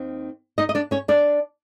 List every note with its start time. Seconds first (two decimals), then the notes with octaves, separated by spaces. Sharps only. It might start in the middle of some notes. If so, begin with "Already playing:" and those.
Already playing: D#2 D#3 C4
0.58 D#4 D#5
0.69 D#5
0.75 D4 D5
0.91 C#4 C#5
1.08 D4 D5